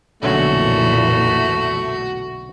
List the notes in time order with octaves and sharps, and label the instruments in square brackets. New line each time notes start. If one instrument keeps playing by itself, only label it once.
[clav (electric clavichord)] B1 D3 C#4 [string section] F2 A#2 E3 [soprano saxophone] A3 [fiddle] F#4